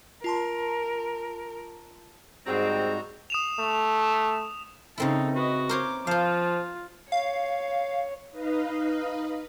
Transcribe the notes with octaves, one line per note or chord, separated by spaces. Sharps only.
F4 A#4 A5 C6
G#2 G3 C4 F#4 G#4 A#5
D#6 E7 F7
A3
C#3 C4 D#4 E4 A4
F#4 B4 D#5
A#4 C5 C#5 D6
F3 F4 C5 F5
C#5 F5
D#4 B4 D#5 F5